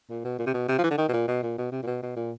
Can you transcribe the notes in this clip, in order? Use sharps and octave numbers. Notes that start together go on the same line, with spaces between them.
A#2
B2
A#2
C3
B2
C3
F3
E3
D3
D#3
B2
A#2
B2
A#2
B2
C3
A#2
B2
B2
A#2